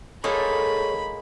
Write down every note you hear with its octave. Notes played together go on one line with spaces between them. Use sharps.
G#3 A#3 D#4 G#4 A4 C#5 B5 C#6